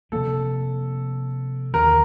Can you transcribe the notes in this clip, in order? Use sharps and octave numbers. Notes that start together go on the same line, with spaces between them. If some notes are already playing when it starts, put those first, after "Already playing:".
C3 F3 A#3 D4 A4
D#2 D3 F3 A#4